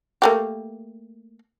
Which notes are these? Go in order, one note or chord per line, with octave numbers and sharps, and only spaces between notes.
A3 A#3 G4